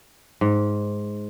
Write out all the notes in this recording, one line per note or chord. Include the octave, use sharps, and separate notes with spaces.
G#2